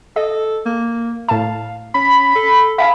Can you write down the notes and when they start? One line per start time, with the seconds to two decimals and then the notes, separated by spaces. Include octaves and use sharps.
0.16 A4 D#5
0.66 A#3
1.29 A2 F5 A5
1.94 C#4 B5
2.35 A4
2.78 E5 F5 G#5 B5